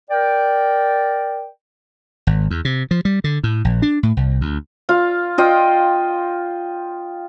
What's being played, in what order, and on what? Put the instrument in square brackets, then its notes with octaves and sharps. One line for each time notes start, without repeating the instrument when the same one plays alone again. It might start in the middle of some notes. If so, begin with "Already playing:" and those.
[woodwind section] A#4 D5 G5
[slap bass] G#1
E2
C3
F3
G3
D3
A2
A#1
D4
A2
C2
D2
[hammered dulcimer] F4 F5
F4 D#5 G5